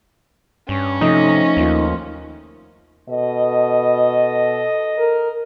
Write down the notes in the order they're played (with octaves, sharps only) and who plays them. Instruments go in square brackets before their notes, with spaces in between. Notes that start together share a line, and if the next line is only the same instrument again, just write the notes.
[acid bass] G2 [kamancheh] C#4
[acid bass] C3 [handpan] F3 A3 D#5 [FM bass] D#4
[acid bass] D#2 [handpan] A#3 F4
[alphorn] B2 [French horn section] A4 D#5
[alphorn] A#4